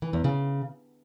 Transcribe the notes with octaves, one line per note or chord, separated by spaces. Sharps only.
E3
E2
C#3